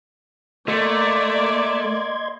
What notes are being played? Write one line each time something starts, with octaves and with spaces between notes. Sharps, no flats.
A3 A#3 D5 D#5 C6 G#6